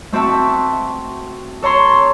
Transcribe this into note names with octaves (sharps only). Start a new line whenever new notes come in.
A3 C4 F#4 E5 A5
A4 C#5 A#5 C6